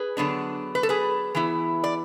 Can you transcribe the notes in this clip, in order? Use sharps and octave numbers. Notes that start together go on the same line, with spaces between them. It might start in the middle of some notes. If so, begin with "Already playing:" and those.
Already playing: G#4 B4
D3 F#3 B3 D4
B4
A4
G#4 B4
E3 B3 E4
D5